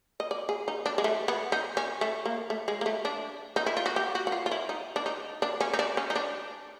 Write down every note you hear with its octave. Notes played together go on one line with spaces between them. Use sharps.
D#5
D5
G#4
D#4
D4
G#3
A3
B3
D#4
C#4
A3
A#3
A3
G#3
A#3
A3
D4
D#4
E4
F4
F#4
G4
F#4
F#4
F4
F4
E4
D#4
D4
D#4
D4
C#4
D#4
D4
C#4
D#4
D4